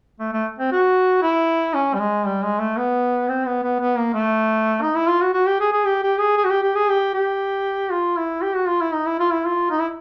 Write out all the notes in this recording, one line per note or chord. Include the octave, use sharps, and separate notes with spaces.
A3
A3
C4
F#4
E4
C#4
G3
G#3
G3
G#3
A3
B3
C4
B3
B3
B3
A#3
A3
D#4
E4
F4
F#4
F#4
G4
G#4
G#4
G4
G4
G#4
G#4
F#4
G4
G4
G#4
G4
G4
F4
E4
G4
F#4
F4
E4
D#4
E4
F4
E4
F4
D#4
E4